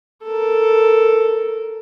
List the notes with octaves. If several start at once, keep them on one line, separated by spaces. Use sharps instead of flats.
A4 A#4